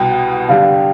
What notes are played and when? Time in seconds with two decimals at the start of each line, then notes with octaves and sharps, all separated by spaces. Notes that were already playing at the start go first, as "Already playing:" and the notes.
Already playing: C2 B2 B3 G5
0.48 G2 D3 G3 D4 G4 F5